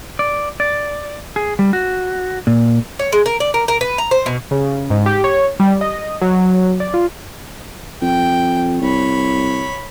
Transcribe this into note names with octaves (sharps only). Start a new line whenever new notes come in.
D5
D5
G#4
G3
F#4
A#2
C#5
G#3
A#4
D5
A#4
A#4
B4
A#5
C5
B2
C#3
G#2
G4
C#5
G3
D#5
F#3
D5
F4
F2 G5
C2 C#5 B5